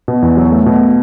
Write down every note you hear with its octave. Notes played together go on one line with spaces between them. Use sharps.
B2
E2
F#3
A3
B2